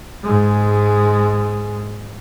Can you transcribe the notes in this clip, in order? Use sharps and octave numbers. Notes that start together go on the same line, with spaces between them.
G#2 G#3